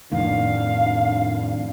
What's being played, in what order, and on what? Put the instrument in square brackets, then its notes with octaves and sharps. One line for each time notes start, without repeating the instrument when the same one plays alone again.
[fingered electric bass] F2 A2 D#3 [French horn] D4 [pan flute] F5